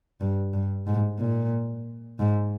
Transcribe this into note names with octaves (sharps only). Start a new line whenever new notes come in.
G2
G2
G#2
A#2
G#2